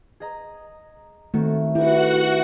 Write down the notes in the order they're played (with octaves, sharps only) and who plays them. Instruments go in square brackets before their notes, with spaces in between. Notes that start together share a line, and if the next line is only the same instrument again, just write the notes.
[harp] G#4 D#5 A#5
[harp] D#3 C4 F#4 [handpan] A3
[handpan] E4 [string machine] F#4 F#5 [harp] G4 B4